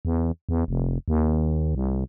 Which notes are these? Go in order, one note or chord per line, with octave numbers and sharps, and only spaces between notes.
E2
E2
F1
D#2
C2